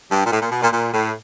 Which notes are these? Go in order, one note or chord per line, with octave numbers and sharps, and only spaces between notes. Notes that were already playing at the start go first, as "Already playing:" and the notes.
G2
A#2
A2
A#2
B2
A#2
A#2
A2